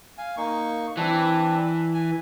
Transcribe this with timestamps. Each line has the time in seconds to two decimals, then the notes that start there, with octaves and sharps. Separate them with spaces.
0.18 F5 G#5
0.37 A#3 D#4 C#6
0.97 E3 C4 D4 B4
1.94 G#5